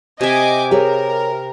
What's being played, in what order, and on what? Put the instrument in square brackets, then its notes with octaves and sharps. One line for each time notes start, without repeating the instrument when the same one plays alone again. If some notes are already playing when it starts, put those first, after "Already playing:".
[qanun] C3 E5 [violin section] D#5 G#5 D6
[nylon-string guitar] G4 G#4 C#5 [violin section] A#4